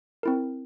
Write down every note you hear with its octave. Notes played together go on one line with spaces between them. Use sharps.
C4 E4 A#4